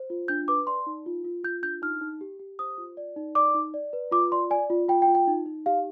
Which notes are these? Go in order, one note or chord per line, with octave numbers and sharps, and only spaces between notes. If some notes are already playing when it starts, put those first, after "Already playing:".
Already playing: C5
F4
D4 G6
B4 D6
D5 C6
D#4
F4
F4
F4 G6
D4 G6
D#4 F6
D#4
G4
G4
C5 D#6
F4
D5
D#4
D5 D6
D#4
D5
B4
F4 D6
D5 C6
D5 G#5
F4
F4 G5
G5
F4
G5
D#4
D#4
G4 F5